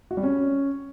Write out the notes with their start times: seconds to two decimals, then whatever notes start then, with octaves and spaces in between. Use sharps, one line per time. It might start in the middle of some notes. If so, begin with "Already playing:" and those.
0.11 F#4
0.17 G3
0.23 C#4